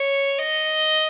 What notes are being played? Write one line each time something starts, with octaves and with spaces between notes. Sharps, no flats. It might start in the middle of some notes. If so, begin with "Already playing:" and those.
Already playing: C#5
D#5